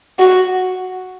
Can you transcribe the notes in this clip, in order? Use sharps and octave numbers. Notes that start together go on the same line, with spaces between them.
F#4